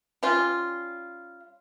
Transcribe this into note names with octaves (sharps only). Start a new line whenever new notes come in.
G3 C#4 F4